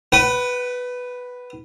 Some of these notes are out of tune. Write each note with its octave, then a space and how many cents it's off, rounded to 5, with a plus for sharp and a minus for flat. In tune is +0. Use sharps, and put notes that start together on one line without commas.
B4 +0 F#5 +35